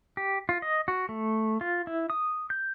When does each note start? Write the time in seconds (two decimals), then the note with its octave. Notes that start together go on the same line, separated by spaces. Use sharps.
0.17 G4
0.49 F4
0.62 D#5
0.88 F#4
1.09 A3
1.61 F4
1.87 E4
2.10 D#6
2.50 G6